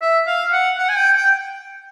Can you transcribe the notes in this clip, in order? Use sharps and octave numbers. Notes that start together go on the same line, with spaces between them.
E5
F5
F#5
F#5
G#5
G5
G5